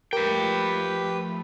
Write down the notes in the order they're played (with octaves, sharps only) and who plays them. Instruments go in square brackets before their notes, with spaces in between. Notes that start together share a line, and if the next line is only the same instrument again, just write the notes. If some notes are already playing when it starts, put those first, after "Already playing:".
[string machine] F3 A3 [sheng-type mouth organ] G4 [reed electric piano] A#4 [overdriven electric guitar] B4 G5